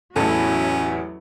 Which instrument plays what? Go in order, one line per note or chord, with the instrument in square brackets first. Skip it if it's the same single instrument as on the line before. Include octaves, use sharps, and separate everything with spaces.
[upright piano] A1 E2 [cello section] F#3 E4 F#4 [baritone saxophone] C#4 [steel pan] A4